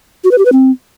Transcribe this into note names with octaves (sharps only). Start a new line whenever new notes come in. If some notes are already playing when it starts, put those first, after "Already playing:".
F#4
B4
G4
B4
C4